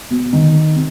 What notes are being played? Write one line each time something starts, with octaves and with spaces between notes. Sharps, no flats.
B2
D#3
C3